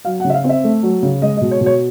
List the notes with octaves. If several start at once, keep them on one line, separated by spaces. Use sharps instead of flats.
F#3 F5
F#5
C#3
E5
F5
C4
E5
A3
F#3
C#3
G#3 D#5
D#5
B2
C#5
B2
C#5